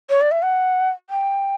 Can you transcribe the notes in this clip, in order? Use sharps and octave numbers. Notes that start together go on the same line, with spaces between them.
C#5
D5
E5
F#5
G5